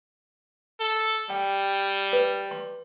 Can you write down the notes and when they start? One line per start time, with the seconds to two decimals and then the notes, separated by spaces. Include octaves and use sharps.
0.80 A4
1.30 G3 G5
2.13 B4
2.51 C6